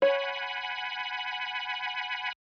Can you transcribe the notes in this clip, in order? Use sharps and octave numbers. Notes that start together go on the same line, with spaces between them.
C#5 F#5 G#5 B5